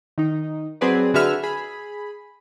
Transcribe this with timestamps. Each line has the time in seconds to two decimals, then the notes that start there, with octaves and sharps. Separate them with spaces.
0.18 D#3 D#4
0.81 F#3 C4 G#4 B4 D5
1.14 D3 F#4 G#4 B4 E5 F6
1.43 G#4 B5